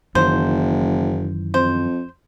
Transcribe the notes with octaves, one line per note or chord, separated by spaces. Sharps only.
F#1 F#2 D#3 E3 C5
F2 C5